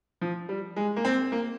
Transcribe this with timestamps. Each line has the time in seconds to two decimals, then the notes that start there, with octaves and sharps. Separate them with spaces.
0.21 F3
0.49 G3
0.76 G#3
0.96 A#3
1.05 C4
1.32 A#3